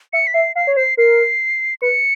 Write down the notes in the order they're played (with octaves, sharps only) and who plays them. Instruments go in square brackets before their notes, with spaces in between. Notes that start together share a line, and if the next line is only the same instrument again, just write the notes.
[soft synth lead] E5 [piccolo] C#7
[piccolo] B6
[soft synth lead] E5 [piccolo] C7
[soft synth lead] F5 [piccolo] C7
[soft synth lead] C#5
[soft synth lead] C5 [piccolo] C7
[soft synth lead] A#4 [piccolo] C7
[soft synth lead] B4 [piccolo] C#7